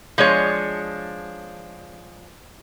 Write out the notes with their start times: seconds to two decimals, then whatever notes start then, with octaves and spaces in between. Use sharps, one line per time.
0.18 F3 G#3 D4 C#5